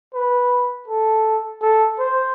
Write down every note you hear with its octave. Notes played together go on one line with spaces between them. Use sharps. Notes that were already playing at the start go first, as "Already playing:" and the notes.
B4
A4
A4
C5